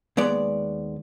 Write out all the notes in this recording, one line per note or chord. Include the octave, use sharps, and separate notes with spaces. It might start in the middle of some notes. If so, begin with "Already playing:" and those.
D#2 G#3 B3 D5